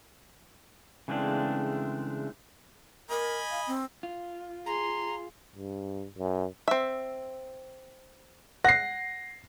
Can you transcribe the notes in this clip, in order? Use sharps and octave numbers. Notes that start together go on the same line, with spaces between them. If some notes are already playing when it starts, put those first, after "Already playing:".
C#3 E3 G#3 A3 C4 D4
A#4 D#5 G#5 B5
F5
C4
F4
G#4 A#5 C6
G2
F#2
C4 E5
F#5 A#6 C7